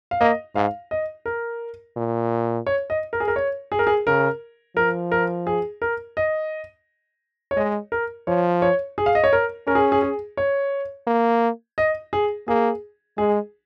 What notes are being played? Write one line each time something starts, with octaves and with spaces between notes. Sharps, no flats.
F5
A#3 D#5
G#2 F5
D#5
A#4
A#2
C#5
D#5
A#4
G#4
A#4
C#5
G#4
A#4
G#4
C#3 A#4
F3 A#4
A#4
G#4
A#4
D#5
C#5
G#3 D#5
A#4
F3 C#5
C#5
G#4
F5
D#5
C#5
A#4
C#4 A#4
G#4
G#4
G#4
C#5
A#3
D#5
G#4
A#3 G#4
G#3 G#4